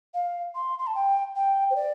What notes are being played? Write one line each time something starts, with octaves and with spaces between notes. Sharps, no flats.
F5
C6
C6
A5
G5
G5
C5
D5